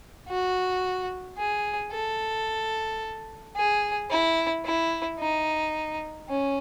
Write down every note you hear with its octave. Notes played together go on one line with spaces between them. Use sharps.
F#4
G#4
A4
G#4
E4
E4
D#4
C#4